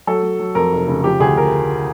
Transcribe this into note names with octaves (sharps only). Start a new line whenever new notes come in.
F#3 A4
F#3
F#3
F2 A#4
F1
C#3
F3 G4
D2 G#4
A#4